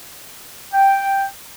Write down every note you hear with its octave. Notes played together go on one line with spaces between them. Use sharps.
G5